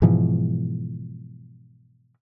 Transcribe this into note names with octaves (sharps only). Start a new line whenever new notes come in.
G#2 B2 E3 F3